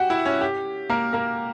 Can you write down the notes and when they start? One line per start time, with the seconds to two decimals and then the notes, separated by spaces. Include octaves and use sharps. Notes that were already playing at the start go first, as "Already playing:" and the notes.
Already playing: F#4 G4 F#5 G5
0.10 E4 E5
0.25 C#4 C#5
0.41 G4
0.90 A#3 A#4
1.13 A#3 A#4